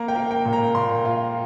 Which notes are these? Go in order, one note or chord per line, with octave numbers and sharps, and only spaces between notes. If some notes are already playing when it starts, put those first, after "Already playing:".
Already playing: A#3 A#5
G5
A#3
G5
A#2
A#5
A#2 C6
F4